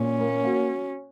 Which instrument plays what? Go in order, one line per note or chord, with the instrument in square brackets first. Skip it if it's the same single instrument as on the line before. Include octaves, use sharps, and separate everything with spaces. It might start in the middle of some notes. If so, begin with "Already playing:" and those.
Already playing: [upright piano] A#2 [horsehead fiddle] C#4
[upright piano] A#3
F#4